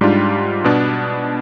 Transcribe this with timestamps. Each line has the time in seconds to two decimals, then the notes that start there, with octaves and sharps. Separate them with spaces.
0.01 G#2 G3 D4 F4
0.64 B2 B3 D4